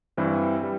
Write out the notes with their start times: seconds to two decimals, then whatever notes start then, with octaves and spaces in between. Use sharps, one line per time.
0.17 G2 E3 G3 C4 E4
0.63 G3